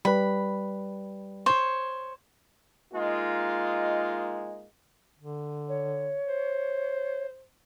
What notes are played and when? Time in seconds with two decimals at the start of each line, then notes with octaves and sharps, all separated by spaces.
0.05 G3 B4 B5
1.46 C5 C#5
2.93 G#3 A#3 D#4 F4
5.18 D3
5.68 C#5
6.26 C5